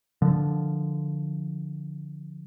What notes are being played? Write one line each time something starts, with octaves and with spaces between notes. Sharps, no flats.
D3 F3